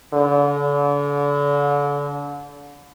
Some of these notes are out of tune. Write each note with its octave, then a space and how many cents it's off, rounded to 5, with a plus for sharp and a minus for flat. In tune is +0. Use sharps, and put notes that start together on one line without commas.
D3 -35